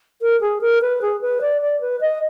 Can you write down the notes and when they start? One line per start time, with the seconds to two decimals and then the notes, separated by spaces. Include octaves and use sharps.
0.22 A#4
0.41 G#4
0.61 A#4
0.81 B4
1.02 G#4
1.21 B4
1.41 D5
1.61 D5
1.81 B4
2.01 D#5